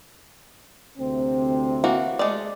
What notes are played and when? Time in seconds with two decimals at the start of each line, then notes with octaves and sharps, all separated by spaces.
0.98 D2 C3 C4
1.84 E3 A#3 F#4
2.19 G#3 A3 D5